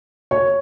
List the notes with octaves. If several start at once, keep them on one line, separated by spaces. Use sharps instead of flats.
C#5